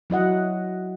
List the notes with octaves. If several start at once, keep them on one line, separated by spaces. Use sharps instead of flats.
F#3 E4 D#5 F#5